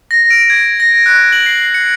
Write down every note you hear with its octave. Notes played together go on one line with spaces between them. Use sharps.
A#6
D7
G#6
A#6
F#6
F#7
C7
C#7